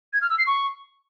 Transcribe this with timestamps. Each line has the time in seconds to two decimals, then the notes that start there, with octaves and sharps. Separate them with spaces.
0.13 G#6
0.22 F6
0.30 E6
0.38 C7
0.47 C#6